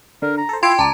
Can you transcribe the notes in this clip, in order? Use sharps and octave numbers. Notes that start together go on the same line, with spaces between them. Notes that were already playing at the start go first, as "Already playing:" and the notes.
D3 A#4
A#5
A4 C5
E4 F4 F5 G5 C6 D6 G#6 D7
C#2 D5 A5 A#5